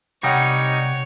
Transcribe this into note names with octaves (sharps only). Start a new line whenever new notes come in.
C3 G3 D#4 C#5 F#5 G5